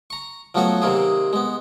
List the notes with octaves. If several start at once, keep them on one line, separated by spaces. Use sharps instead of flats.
A#5 C#6
F3 F#3 A3 B3 F#4 C#5
C3 D#3 A#3 C4 G#4
G#3 B3